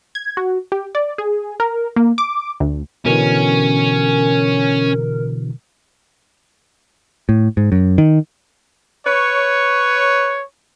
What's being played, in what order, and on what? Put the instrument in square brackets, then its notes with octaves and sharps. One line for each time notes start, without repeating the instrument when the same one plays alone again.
[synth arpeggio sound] G#6
F#4
G4
D5
G#4
A#4
A#3
D6
D2
[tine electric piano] B2 D3 E3 [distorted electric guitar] C#4 [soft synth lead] A#4
[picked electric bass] A2
G#2
F#2
D#3
[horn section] B4 C#5